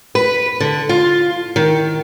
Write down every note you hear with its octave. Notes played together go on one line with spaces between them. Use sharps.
B4
D3
F4
D#3